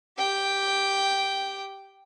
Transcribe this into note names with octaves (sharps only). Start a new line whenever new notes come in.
G4 G5